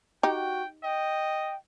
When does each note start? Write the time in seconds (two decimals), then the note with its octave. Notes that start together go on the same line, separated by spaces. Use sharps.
0.23 D#4 F#4 G4 G5
0.83 D#5 G5